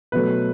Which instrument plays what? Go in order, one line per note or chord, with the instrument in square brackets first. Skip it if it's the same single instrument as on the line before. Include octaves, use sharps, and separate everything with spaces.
[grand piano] B2 F#3 A3 B4